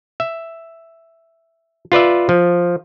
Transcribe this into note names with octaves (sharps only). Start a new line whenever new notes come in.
E5
F4 B4 D5 E5
F3